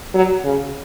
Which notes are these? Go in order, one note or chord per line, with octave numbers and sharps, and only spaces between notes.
F#3
C#3